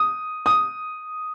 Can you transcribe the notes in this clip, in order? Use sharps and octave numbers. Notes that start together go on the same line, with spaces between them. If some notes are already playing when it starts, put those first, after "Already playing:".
Already playing: D#6
D#6